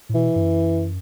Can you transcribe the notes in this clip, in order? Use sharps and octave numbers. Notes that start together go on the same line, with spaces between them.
A2
B2 E3
G2
F#2